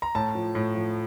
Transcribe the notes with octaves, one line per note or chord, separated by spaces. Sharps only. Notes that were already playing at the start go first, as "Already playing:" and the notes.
A#5
A2 A5
F3
A2
F3